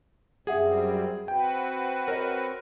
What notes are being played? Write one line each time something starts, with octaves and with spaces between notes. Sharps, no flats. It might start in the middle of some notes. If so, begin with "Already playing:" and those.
F#2 G3 C4 G#4 E5 F#5 D#6
C4 F#4 B4 G5
A#4 C#5 D#5